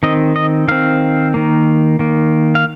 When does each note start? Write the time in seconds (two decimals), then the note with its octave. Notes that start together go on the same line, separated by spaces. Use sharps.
0.03 D#3 C4 D#5
0.36 D#5
0.68 D#3 C4 F5
1.34 D#3 A#3
1.99 D#3 A#3
2.55 F5